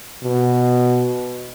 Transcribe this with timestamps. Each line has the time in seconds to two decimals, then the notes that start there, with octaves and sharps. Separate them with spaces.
0.23 B2